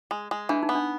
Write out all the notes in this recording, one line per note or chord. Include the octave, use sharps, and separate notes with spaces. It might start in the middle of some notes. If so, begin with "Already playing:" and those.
G#3
G#3
E3 D4
D#4
B3
D4